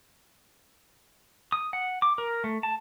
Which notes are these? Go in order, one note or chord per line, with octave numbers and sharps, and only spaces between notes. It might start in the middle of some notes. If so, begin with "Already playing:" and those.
D#6
F#5
D6
A#4
A3
A5